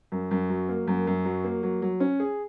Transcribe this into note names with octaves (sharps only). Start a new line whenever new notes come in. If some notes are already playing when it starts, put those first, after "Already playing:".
F#2
F#2
F#3
A#3
F#2
F#2
F#3
A#3
F#3
F#3
C#4
G#4